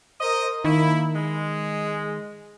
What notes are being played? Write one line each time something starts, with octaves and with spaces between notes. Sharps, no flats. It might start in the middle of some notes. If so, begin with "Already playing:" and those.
A#4 C5 D#5
D#3 A#3 E4
G#3